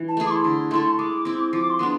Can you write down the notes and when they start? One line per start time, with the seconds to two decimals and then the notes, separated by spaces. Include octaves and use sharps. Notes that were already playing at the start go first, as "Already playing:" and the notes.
Already playing: E3
0.08 A5
0.17 A3 E4 G#4
0.26 D6
0.31 C6
0.44 D3
0.71 A3 E4 A4
0.98 G#3 D6
1.25 C4 E4
1.53 F3 D6
1.70 C6
1.79 G#3 B3 D4